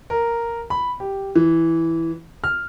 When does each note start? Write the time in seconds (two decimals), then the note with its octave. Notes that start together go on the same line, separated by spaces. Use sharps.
0.10 A#4
0.70 B5
1.00 G4
1.35 E3
2.44 F6